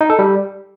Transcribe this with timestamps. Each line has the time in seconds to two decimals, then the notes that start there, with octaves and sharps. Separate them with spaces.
0.01 D#4
0.10 A4
0.19 G3